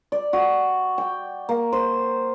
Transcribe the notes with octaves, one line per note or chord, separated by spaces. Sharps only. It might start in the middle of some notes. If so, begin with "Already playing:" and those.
D5
F#4
G5
A#3
C5